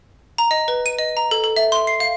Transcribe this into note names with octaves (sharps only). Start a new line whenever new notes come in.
A#5
D#5
B4
D#7
D#5
A#5
A4
A4
E5
C6
C7
F5